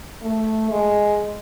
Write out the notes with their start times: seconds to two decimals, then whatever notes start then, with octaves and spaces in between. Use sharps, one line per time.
0.22 A3
0.71 G#3